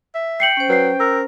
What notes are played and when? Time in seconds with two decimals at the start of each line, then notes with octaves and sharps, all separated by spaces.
0.15 E5
0.40 G5 C7 C#7 F#7
0.57 C#4 C5
0.69 F#3 B4 C7
1.00 A#4 E6